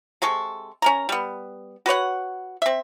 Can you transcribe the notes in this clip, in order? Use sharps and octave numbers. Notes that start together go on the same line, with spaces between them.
C3 G#3 A4 C#6
C#4 A#4 A#5
G3 B3
F#4 B4 C#5 F#5
C4 E5